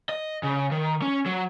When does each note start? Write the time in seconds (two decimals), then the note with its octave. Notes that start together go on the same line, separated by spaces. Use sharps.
0.09 D#5
0.43 C#3
0.71 D#3
1.02 C#4
1.26 F#3